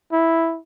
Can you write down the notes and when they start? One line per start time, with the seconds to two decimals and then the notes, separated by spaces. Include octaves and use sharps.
0.12 E4